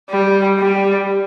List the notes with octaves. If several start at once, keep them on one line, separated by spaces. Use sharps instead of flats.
G3
G3